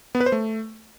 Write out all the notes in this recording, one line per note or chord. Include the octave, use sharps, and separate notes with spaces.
B3
B4
C5
A3